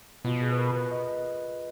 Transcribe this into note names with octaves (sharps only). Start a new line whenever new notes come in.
B2 F4
G#4
B4
A#4
B4
D#5